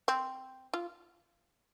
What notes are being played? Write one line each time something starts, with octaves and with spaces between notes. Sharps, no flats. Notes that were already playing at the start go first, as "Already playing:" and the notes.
C4
F4